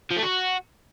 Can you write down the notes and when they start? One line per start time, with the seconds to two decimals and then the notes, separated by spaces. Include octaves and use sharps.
0.11 F3
0.16 A3
0.22 F#4